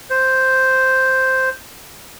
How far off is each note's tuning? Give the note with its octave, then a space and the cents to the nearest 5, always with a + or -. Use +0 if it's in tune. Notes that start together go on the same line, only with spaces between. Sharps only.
C5 +0